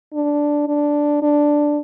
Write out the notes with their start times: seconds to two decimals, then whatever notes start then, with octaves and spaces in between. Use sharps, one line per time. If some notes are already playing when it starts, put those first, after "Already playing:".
0.13 D4
0.68 D4
1.22 D4